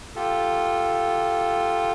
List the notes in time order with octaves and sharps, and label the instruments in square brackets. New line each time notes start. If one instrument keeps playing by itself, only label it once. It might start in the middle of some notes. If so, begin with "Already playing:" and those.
[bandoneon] F4 G4 A4